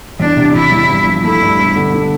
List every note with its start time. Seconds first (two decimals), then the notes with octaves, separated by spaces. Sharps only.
0.20 E2 D4
0.37 C3
0.54 E2 E4
0.72 E2
0.89 G2
1.07 F3
1.24 A3 E4
1.42 G2
1.59 E1
1.76 D3
1.93 D3